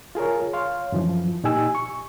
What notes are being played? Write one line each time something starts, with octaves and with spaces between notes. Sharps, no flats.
F4 G#4 A#4 C#5
C#5 F5 C6
F#2 E3 F3
A#2 D#4 G4 G#5 E6
C#6